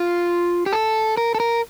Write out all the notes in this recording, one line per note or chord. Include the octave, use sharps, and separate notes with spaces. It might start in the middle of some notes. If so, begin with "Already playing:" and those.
Already playing: F4
G4
A4
A#4
A4
A#4